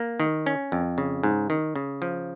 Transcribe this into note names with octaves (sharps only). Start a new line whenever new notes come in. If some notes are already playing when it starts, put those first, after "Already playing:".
Already playing: A#3
D#3
C#4
F2
C#3
G#2
D#3
C#3
F3